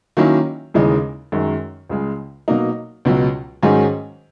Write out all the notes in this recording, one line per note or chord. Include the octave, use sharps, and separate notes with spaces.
D#3 F#3 A#3 C#4 E4
D#2 C#3 E3 G#3 D#4
F#2 D#3 G#3
C#2 C#3 G#3
B2 F#3 A#3 D#4
C#2 B2 F#3
G#2 D#3 F#3 C#4 G#4